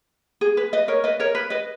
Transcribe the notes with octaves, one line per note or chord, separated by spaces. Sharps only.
G#4
B4
B4 D#5
A#4 C#5
B4 D#5
A#4 C#5
B4
B4 D#5